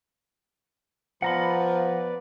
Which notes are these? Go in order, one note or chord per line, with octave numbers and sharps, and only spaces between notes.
F3 B3 B4 D5 F#5 A#5 B5